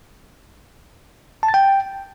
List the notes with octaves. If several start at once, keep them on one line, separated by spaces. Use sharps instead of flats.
A5
A6
G5